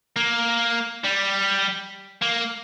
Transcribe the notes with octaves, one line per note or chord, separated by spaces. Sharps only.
A#3
G3
A#3